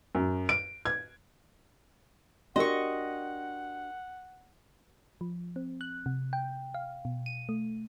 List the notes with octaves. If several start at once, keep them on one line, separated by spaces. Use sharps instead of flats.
F#2
D7
G#6
D4 F#4 G4 A#4 D#5 F#5 C6 C#6
F3
C4
F#6
C3
G5
F5
B2
D#7
A3